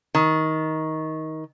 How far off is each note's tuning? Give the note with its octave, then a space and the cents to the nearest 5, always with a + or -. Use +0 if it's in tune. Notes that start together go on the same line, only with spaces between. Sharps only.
D#3 +20